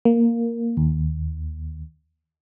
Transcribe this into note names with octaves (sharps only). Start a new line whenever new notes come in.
A#3
D#2